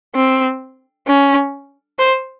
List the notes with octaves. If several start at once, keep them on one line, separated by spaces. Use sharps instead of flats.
C4
C#4
C5